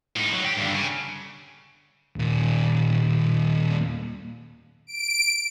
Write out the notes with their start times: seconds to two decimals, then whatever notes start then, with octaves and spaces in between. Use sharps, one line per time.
0.16 A2 D#4
0.32 F#3
0.45 G4
0.57 G2 D3
0.74 C#3
2.16 D#2 A#2
4.87 D7